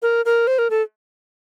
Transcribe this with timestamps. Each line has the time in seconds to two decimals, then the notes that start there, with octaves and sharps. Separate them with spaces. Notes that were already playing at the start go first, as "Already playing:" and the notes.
0.02 A#4
0.25 A#4
0.47 C5
0.59 A#4
0.70 A4